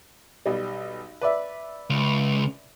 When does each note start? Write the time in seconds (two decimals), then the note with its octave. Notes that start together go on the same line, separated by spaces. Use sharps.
0.46 B1 G3
1.21 B4 D5 E5
1.90 C#2